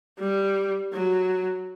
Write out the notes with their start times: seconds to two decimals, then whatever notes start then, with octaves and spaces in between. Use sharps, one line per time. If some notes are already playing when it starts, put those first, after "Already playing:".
0.18 G3
0.92 F#3